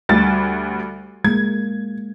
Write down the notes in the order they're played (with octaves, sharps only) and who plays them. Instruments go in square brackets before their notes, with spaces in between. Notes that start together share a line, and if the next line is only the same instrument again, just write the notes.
[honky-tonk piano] D2 G3 A6
[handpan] G#3 A#3 [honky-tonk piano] G#6